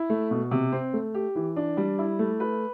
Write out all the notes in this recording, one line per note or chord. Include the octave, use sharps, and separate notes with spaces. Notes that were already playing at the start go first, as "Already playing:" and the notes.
Already playing: E4
A3
B2
C3
C4
A3
G4
E3
D4
G3
E4
A3
B4